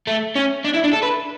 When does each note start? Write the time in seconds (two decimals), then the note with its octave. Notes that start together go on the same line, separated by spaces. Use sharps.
0.07 A3
0.35 C#4
0.64 D4
0.74 E4
0.84 D4
0.93 A4
1.03 B4